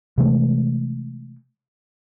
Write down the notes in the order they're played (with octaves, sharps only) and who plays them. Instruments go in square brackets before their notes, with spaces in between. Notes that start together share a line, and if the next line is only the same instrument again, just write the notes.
[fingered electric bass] C3 E3 G#3 A3